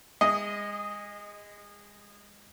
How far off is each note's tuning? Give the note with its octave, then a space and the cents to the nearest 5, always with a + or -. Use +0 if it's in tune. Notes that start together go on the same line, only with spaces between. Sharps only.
G#3 -25 D#5 +0